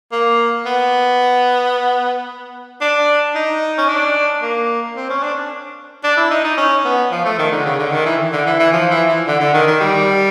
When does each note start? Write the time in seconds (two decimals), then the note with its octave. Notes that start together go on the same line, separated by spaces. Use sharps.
0.12 A#3
0.65 B3
2.81 D4
3.35 D#4
3.78 C#4
3.88 D4
4.42 A#3
4.96 C4
5.10 C#4
5.23 D4
6.04 D4
6.17 E4
6.30 D#4
6.44 D#4
6.57 C#4
6.85 B3
7.11 F3
7.25 A3
7.39 D#3
7.52 D3
7.65 C#3
7.79 D3
7.92 D#3
8.05 E3
8.32 D3
8.46 E3
8.59 E3
8.73 F3
8.90 E3
9.08 E3
9.26 D3
9.40 D3
9.54 D#3
9.67 D#3
9.80 G3